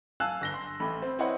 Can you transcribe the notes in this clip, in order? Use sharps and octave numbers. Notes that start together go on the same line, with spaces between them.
F5 G#5 A5 E6 F#6
G1 A#6 G7
C6
A1 A3 B5
C4
C4 E4 B4 C#5 D#5 F#5